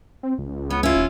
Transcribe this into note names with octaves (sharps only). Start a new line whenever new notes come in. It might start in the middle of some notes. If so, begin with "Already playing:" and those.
C4
C#2
B3 C#4
C#4 E4 F4
D#1